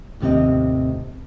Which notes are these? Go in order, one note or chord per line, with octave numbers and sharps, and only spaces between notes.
D#2 A2 C3 D#3 C4 D#5